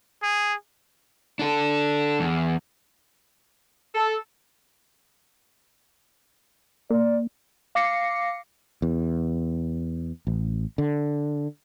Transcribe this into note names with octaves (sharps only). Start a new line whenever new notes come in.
G#4
D4 A4
E2
A4
A#3 D5
F5 D6 A#6 C7 C#7
E2
A1
D3